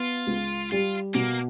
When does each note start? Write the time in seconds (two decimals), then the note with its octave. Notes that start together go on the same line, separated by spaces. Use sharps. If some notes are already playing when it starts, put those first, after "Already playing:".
Already playing: B3 F4
0.27 C#2
0.71 G3 F4
1.15 B2 A#3